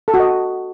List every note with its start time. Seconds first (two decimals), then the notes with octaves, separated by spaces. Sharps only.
0.08 A4
0.14 F#4
0.20 D#5